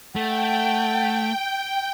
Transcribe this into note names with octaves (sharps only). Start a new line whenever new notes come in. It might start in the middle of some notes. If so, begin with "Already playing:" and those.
A3 F#5 G5